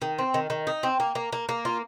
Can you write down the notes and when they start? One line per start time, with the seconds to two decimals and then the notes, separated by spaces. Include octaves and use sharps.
0.02 D#3
0.18 C4
0.34 D#3
0.50 D#3
0.67 D#4
0.83 C4
1.00 A#3
1.15 A#3
1.33 A#3
1.49 A#3
1.65 F4